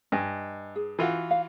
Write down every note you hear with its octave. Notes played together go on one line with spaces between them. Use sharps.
G2 D#5 G#5
G#4
E3 F4 F#4
F5